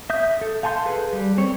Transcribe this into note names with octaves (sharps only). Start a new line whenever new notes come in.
E5 D#6 G6
A4
F5 G#5 A5 C6 G6
G#4 A4 B4
G3
C4 C#5